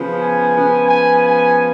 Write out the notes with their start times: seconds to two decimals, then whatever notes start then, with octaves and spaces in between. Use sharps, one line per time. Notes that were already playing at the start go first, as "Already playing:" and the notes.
Already playing: C#3 F3 B3
0.22 G#5
0.56 C#3 F3 B3
0.89 G#5
1.22 G#5